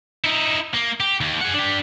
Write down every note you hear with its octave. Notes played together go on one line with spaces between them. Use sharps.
D#4 E4
A#3
G4
D#2
G#4 F#5
D4 G4